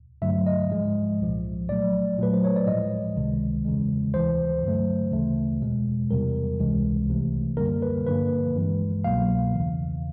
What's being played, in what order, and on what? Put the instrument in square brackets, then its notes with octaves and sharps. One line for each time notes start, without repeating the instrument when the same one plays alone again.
[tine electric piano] G2 D3 F#3 A3 E5
D#5
G#2 F3 G#3
C2 A#2 F3
A#2 F#3 A3 D5
A#2 F#3 A3 B4
C5
C#5
D5
A2 F3 G#3 D#5
C#2 C3 D#3 G#3
E2 C#3 E3 G#3
D2 C3 E3 C5
G2 D3 F#3 A3
D2 C#3 E3 A3
E2 B2 G#3
E2 C3 E3 G3 A#4
C#2 C3 E3 G#3
C2 C3 E3 A3
F#2 D3 G3 A#3 A#4
B4
G2 D3 F3 A#3 B4
G2 E3 G#3
C2 B2 F#3 A#3 F5
E2 C#3 E3